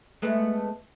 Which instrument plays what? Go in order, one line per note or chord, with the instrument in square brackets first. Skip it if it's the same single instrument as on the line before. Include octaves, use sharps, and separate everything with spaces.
[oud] G#3 A3 B3